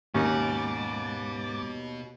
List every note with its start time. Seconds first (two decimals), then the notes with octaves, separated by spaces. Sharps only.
0.14 D#2 G#2 B2 C#4 D#4 F#5 D6 A6